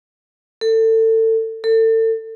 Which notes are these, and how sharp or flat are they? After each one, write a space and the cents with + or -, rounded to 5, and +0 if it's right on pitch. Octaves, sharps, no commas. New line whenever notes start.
A4 +30
A4 +35